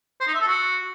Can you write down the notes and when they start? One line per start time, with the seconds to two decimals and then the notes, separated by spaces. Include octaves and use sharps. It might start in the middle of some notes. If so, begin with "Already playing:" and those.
0.20 C5
0.27 D#4
0.34 E5
0.41 A4
0.48 F#4